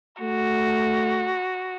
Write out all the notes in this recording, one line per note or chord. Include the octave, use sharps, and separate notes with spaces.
A3 F#4